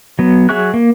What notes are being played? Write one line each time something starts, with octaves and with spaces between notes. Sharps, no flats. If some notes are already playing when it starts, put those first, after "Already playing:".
F#3 B3
F#3 G#4 E5 C#6 F#6
A#3